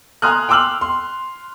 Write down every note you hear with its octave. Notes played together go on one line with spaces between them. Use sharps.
G#5 A#5 C6 D#6 F6 F#6
G5 C6 D6 E6 F6 F#7
C6